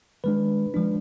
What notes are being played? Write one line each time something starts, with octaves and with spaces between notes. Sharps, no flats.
D#3 G#3 D4 B4
F3 G#3 D4